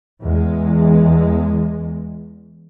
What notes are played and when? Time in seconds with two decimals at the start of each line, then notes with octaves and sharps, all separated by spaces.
0.21 E2 G#3